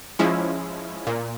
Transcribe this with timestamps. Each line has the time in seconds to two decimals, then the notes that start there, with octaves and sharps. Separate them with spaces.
0.19 F3 G#3 C#4 E4
1.07 A#2